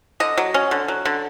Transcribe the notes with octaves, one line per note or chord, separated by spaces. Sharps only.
D3 D#5
F#3
C#4
D3
F#3
D3